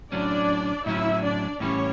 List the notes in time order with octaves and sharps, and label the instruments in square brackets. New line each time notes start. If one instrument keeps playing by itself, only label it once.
[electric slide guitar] A2 F#3 C#4 [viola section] D4 D5
[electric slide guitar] A2 F#3 C#4 [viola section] E4 E5
[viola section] D4 D5
[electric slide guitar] A2 E3 G3 [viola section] C#4 C#5